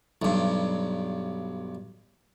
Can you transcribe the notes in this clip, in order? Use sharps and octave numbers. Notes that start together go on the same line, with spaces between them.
B1 G2